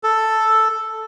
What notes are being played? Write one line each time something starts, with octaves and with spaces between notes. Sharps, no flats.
A4